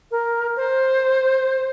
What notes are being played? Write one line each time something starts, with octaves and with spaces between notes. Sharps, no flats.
A#4
C5